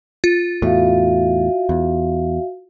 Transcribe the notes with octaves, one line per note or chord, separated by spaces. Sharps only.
F4
E2 A2 F#4 E5 F5
E2